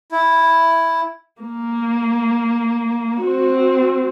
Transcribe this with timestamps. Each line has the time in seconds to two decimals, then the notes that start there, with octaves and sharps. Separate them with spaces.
0.12 E4
1.42 A#3
3.22 C4 F#4